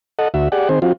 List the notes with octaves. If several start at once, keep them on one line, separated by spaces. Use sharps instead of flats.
A4 D#5 F#5
D2 F#4 E5
G4 G#4 D5 F#5
D#3 C4 G#4 C5
F3 C4 F4 F#4